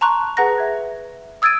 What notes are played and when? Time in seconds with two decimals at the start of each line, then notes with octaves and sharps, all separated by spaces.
0.01 A5 A#5 C6 C#6 F#6
0.37 G#4 B4 F#5 A#5 F#6 A#6
0.58 E5 G#6
1.42 D#6 E6 G#6 A6 D7 D#7